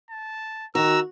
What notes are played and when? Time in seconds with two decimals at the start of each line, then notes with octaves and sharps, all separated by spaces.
0.10 A5
0.75 D#3 F#4 A#5 E6